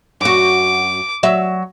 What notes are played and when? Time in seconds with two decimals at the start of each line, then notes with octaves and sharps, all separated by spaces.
0.21 F#2 F#4 D6
1.23 F#3 E5